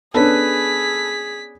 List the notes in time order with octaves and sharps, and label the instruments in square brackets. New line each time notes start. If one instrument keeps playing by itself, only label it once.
[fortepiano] B3 C#4 D4 [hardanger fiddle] G#4 [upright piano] A4 B4 [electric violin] B6